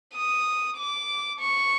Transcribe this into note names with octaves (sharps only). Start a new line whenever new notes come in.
D#6
D6
C#6